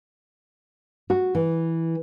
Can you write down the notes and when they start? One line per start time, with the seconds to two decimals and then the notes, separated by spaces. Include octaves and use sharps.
1.10 F#4
1.35 E3